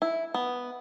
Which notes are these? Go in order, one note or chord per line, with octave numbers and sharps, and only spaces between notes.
E4
B3